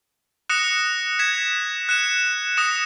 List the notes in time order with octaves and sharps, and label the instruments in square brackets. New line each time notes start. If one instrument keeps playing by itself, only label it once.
[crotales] D#6 F#6 A#6 C#7 E7
G#6 B6 E7
F#6 C#7 E7
D#6 A#6 C#7 E7